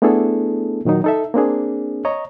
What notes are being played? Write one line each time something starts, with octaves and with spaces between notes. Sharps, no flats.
A3 B3 D4 E4 G#4 A4
A#2 D#3 F#3 D#4
D#4 A4 E5
A#3 C4 D4 G#4
C#5 D#5 A#5